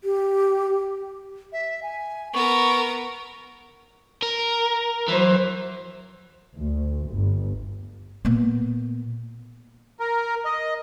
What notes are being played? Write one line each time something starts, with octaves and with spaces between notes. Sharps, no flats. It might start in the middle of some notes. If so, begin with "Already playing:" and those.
G4
E5
G#5
B3 A#4 C#6
A#4
E3 F#3 C5
D2
G1
A#2 B3
A#4
D#5